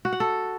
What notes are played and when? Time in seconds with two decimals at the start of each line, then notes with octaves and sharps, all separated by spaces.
0.05 F#4
0.13 F#5
0.20 A4